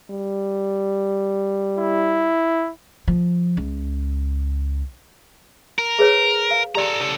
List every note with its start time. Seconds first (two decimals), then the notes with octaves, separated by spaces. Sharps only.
0.11 G3
1.79 E4
3.08 F3
3.57 C#2
5.79 A#4
5.99 G#4 B4 C#5
6.51 F5
6.75 G4 A4 D5 A#5 C6
7.01 C#3 A4